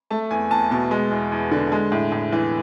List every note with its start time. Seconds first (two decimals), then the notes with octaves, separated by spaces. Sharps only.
0.11 A3 A5
0.31 E2 G#5
0.51 E2 A5
0.71 B2 A5
0.91 G#3
1.11 E2
1.32 E2
1.51 D3
1.72 G#3
1.92 A2
2.12 A2
2.32 E3